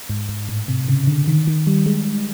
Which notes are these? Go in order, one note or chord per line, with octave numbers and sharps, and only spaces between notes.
G#2
G#2
A2
C3
C#3
D3
D#3
D#3
G3
G#3